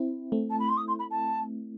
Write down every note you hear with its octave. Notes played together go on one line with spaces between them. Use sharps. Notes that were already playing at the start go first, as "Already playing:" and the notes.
Already playing: C4 E4
A3 C4
A5
B5
C6
D#6
C6
B5
A5